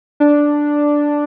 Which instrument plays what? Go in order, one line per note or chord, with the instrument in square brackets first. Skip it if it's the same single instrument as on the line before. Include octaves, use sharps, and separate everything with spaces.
[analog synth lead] D4